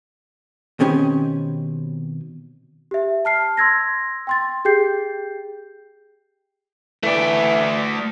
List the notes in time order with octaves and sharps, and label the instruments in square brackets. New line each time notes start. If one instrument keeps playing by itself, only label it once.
[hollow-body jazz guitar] B2 D#3 C4 C#4 G4 G#5
[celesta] G4 E5
A5 F6 C7
C6 E6 G#6 A#6
G5 C6 A6
G4 G#4 G5 G6 C7
[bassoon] E3 [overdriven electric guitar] A3 D5